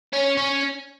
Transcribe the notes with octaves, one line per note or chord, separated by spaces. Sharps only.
C#4
C#4